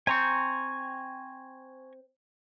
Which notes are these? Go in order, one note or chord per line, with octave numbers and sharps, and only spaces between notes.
C4 G#5 A#5 C#6